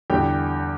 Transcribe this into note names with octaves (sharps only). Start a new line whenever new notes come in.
E2 D3 G3 G4 G5